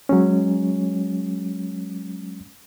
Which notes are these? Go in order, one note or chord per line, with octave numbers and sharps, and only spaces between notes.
F#3 G#3 C#4